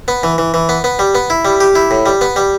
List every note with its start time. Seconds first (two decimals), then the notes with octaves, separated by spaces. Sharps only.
0.08 B3
0.23 E3
0.38 E3
0.54 E3
0.69 B3
0.84 B3
0.99 G3
1.15 B3
1.30 E4
1.45 G3
1.60 G4
1.75 E4
1.91 A2
2.06 G3
2.21 B3
2.36 G3